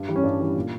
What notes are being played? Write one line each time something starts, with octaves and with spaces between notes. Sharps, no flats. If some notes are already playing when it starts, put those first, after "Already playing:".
Already playing: G2
E3 G3
C#4
G2 D4
E3 G3
A#2